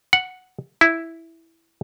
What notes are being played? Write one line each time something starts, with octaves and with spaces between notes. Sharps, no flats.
F#5
E4